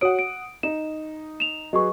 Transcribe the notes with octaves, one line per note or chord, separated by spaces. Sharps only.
F#4 C#5 F#5 D#6 D7
D7
D#4 E7
E7 F7
F#3 G#4 B4 D#5 C#6